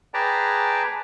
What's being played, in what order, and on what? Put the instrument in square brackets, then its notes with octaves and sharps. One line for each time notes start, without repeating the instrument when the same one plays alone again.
[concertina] G#4 B4 D5 G5 A5 A#5